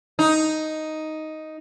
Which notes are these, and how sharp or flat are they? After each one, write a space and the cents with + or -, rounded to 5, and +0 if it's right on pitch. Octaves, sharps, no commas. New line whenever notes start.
D#4 +5